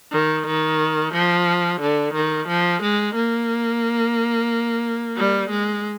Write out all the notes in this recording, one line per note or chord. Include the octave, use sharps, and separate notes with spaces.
D#3
D#3
F3
D3
D#3
F3
G#3
A#3
G3
G#3